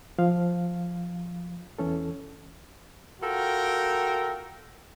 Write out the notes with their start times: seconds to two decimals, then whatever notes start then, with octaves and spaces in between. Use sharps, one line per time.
0.18 F3 F5
1.78 E2 E3 C#4 A4
3.22 F4 F#4 A4 A#4 G5